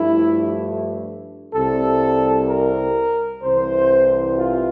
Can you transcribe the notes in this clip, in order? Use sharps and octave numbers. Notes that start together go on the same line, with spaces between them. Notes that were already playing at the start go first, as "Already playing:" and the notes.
Already playing: G2 F3 A3 E4
C2 C3 G3 A4
A#4
C2 C3 E3 C5
F4